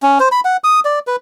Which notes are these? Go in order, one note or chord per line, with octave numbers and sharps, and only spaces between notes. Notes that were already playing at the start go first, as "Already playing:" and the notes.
C#4
C5
B5
F#5
D#6
D5
B4